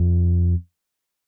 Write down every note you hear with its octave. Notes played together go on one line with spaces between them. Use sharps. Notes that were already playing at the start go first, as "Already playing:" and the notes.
Already playing: F2